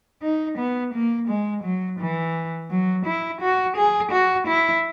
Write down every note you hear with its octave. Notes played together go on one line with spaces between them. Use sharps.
D#4
B3
A#3
G#3
F#3
E3
F#3
E4
F#4
G#4
F#4
E4